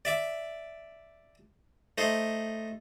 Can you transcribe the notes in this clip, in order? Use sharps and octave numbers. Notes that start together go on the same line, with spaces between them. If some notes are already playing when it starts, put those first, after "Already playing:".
D5 E5 D6
A3 D#4 C5